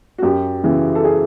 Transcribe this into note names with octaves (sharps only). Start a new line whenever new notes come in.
F#4
F#2 G4
C#3 E3
A4
G#4